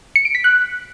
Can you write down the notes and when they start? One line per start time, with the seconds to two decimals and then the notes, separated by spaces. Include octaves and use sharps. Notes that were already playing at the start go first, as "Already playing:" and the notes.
0.16 C#7
0.25 D7
0.35 B6
0.44 F#6